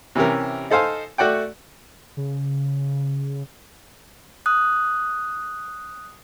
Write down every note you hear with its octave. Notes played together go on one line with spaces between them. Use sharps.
C3 E3 C#4 G4 A#4
D#4 A4 C5 F5 G#5
A3 F#4 D5 F#5 G5
C#3
D#6 F#6